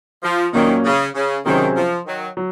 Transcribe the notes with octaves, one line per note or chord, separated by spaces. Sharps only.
F3
A#2 D#3 F#3 A#3 C#4
C#3
C#3
C3 D#3 F#3 C#4 G#4 C5
F3
D#3 F#3
F#3